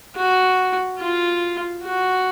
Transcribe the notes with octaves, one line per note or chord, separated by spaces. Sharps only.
F#4
F4
F#4